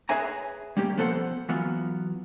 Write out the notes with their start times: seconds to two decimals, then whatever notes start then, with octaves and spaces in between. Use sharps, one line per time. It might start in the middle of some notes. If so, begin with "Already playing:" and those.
0.09 G#4 B4 C#5 E5 G#5 A#5
0.77 G3 A#3 C#4 G4
0.97 F3 B3 A4 C5 F#5
1.49 E3 F#3 B3 F4